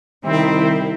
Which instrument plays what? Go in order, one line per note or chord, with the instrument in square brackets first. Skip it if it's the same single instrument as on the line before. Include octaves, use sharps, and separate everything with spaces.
[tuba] C2 [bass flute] D#3 [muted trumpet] C4 [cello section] E4